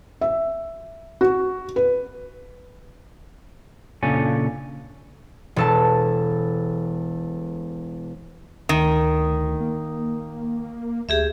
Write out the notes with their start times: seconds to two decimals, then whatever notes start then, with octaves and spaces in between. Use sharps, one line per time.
0.21 E5
1.21 F#4
1.76 B4
4.03 A#2 C#3 D4 A4 C#5 G#5
5.56 E1 A4 A5
8.69 D2 D#3
9.60 A#3
11.09 D2 G4 G#4 E5